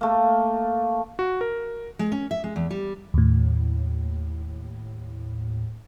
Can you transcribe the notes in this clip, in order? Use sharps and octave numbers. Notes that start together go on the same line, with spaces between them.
A3 A#3
F#4
A#4
G#3
C#4
E5
G#3
E2
G3
D#2 A2